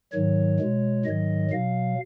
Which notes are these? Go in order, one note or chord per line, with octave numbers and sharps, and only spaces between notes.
G#2 D#3 F#3 C#5
B2 G#3
G#2 D#3 F#3 D#5
B2 F#3 F5